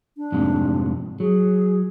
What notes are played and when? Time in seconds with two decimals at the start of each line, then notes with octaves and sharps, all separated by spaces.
0.18 D4
0.32 F2 G#2 C3
1.20 F#3 G#4